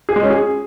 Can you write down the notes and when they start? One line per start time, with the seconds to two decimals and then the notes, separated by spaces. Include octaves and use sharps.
0.09 G#4
0.16 G#3
0.23 C#4
0.30 G#4